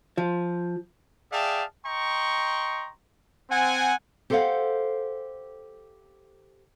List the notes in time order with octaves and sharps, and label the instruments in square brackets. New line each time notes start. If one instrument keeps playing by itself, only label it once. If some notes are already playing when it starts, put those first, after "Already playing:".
[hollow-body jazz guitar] F3
[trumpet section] G#4 D5 E5 F5 G5 A5
D#5 G5 A#5 C6 C#6
C4 F#5 G#5
[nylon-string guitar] G4 A4 C5 D5 F5 F#5